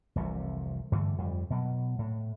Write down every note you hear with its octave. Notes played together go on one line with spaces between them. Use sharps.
F1 C2 C3 E3
G2 D3 E3 A3
F2 G3
B2 F#3
A2